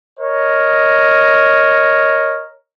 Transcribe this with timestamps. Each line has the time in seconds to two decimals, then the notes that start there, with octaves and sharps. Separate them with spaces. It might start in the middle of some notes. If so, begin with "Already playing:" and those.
0.20 A#4 C#5 D#5